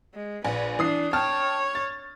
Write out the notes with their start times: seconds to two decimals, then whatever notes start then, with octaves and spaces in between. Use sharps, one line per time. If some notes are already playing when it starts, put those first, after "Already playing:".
0.15 G#3
0.44 A#1 B4 G#5
0.79 E3 D4 D#6 C7
1.13 C#5 G5 A5 F6
1.75 A6